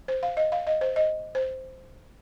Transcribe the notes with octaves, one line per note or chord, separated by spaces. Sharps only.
C5
F5
D#5
F5
D#5
C5
D#5
C5